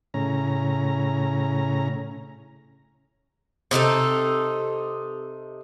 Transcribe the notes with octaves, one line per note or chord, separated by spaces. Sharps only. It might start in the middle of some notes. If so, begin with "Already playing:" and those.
A2 C#3 C#4 A#5
C3 D#4 F4 A4